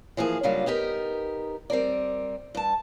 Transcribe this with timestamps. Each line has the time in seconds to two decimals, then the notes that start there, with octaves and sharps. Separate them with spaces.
0.17 E3 F3 A#3 G#4
0.43 C#3 F#3 G3 A#3 D4 F4
0.66 B3 D#4 G4 A#4
1.70 G3 C4 A#4 D5
2.55 G2 A5